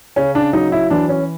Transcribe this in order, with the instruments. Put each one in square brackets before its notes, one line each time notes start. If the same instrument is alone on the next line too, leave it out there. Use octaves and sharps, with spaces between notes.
[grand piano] C#3 C#4
D4
F#3 D#4
E4
E3 D4
C#4